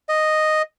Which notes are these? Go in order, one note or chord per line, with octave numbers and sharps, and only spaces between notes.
D#5